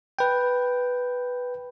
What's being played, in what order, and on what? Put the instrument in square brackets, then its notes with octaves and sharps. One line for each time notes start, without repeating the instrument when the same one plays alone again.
[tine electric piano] B4 G5